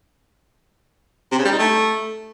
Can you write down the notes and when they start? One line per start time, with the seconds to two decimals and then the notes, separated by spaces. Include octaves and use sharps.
1.31 C3
1.38 C#3
1.45 G3
1.52 D#4
1.59 A3